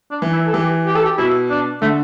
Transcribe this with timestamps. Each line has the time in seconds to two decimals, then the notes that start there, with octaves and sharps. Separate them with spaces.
0.11 D4
0.22 E3
0.33 E4
0.46 A4
0.54 E3 G4
0.86 G4
0.95 A4
1.05 G4
1.18 B2 E4
1.50 D4
1.82 D3 A3